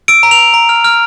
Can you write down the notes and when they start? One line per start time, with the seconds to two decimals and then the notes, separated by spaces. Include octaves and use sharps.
0.08 E6 D7
0.23 A#5
0.31 F7
0.39 A#5
0.54 A#5
0.69 F6
0.84 F6